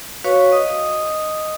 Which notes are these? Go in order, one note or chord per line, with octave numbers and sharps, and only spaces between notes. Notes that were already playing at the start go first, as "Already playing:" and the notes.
F#4 B4 C#5 F5 C#6
D#5 D#6